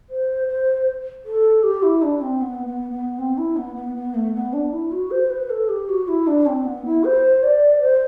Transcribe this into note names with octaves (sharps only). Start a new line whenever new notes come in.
C5
C5
A4
G4
E4
D4
C4
B3
B3
B3
C4
E4
B3
B3
B3
A3
B3
D4
E4
F#4
C5
B4
A4
G4
F#4
E4
D4
C4
B3
E4
C5
D5
C5